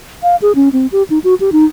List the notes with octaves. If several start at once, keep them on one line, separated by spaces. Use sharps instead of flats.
F5
G#4
C#4
C4
G4
D#4
F#4
G4
D#4